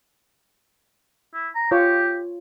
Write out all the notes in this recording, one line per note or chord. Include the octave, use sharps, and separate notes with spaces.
E4
A#5
F4 G4 C#5